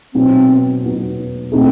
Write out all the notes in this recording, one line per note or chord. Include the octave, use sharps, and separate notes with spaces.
B2 F#3 B3 C4 D#4
B2 F#3 B3 D#4
B2 A3 C4 D#4 A4